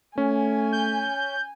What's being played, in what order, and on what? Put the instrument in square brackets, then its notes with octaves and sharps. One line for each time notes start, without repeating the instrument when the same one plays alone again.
[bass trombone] A3 [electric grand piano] C#4 [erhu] G#5
[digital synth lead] G6